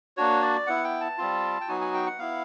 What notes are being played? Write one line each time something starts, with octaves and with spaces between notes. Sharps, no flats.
A#3 D4 F#4 C#5
D5
B3 E4 F#5
G5
A5
G3 C4 F4
G5
F#3 B3 D#4 F#4 G#5
G#5
G5
F#5
B3 E4 F5